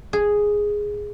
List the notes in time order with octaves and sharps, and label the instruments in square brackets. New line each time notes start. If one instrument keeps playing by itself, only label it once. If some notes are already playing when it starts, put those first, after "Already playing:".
[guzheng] G#4